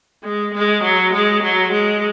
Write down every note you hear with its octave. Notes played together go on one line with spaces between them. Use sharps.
G#3
G#3
F#3
G#3
F#3
G#3